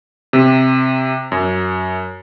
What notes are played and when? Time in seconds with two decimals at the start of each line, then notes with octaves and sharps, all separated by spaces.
0.33 C3
1.32 F#2